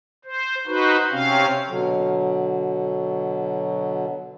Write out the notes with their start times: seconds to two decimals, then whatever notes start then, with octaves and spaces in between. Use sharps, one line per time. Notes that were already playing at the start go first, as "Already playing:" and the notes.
0.25 C5
0.67 D#4 F#4 B4 C5
1.11 C3 C4 C#4 F5
1.68 B2 D3 F#3